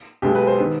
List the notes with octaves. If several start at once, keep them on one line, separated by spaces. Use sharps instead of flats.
B1 B2 G#3 G4
B4
C5
D#3 B3